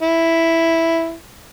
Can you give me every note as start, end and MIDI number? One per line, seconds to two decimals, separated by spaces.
0.01 1.13 64